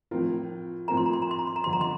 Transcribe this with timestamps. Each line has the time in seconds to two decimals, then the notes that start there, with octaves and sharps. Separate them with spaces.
0.11 A2 F3 C4 F4 A#4
0.88 A2 F3 C4 F4 A#4 A#5
0.97 C6
1.06 A#5
1.13 C6
1.22 A#5
1.31 C6
1.39 A#5
1.47 C6
1.56 A#5
1.64 G1 F2 D3 C6
1.73 A#5
1.81 C6